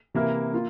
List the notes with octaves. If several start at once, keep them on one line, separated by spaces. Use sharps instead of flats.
C3 E3 A#3 E4 A#4
A#3 F4